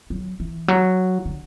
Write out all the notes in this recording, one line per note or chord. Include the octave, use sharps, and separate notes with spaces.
F#3
E3
F#3
D3